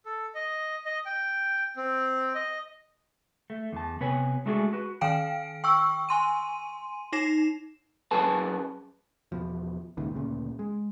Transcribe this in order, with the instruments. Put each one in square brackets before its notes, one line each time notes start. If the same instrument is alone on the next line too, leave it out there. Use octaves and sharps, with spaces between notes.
[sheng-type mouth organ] A4
D#5
D#5
G5
C4
D#5
[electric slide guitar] A3
E2 A5
C3 B3 B4 C#5 G#5
G#3 A3 D4 F#4 G#4
F#4 B4
[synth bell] D#3 F5 G5 D7
G5 C#6 E6
G#5 C6 D#7
D#4 A#6 C7 E7
[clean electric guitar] F#2 G#4 B4 G#5 A5
[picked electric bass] E2 B2 F3
G1 C#2 A#2 D#3
D2 A#2 C#3
G#3